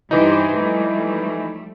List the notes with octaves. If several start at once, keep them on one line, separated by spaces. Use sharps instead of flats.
G2 E3 D#4 G4 C5
F3 G3 A3